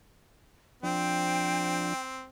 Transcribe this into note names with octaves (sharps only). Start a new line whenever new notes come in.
F3 C4 D4 G5